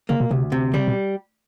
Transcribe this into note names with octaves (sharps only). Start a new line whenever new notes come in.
C#3 A#3
B2
D2 C3
C3
C#3 G3
B2